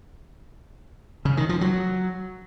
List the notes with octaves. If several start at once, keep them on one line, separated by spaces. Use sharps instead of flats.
C#3
D#3
F3
F#3